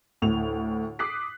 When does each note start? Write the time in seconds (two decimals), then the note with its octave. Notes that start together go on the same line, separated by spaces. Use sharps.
0.22 D2 A2 F7
0.99 D6 D#6 F#6 B6 C7